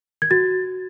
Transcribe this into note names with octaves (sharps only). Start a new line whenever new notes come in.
G#6
F#4 A6